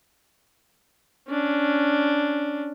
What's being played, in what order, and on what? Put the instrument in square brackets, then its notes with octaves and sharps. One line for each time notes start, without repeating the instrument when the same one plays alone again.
[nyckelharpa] C#4 D4